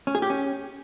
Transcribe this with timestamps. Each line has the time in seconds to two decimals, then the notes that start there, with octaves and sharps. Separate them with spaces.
0.07 C#4
0.15 G#4
0.22 G4
0.30 C#4